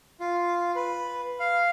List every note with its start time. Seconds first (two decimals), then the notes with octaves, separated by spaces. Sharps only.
0.20 F4
0.76 B4
1.40 F5